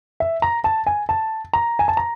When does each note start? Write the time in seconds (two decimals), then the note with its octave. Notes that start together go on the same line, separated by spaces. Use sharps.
0.20 E5
0.42 A#5
0.64 A5
0.86 G#5
1.09 A5
1.53 A#5
1.79 G#5
1.88 A5
1.97 A#5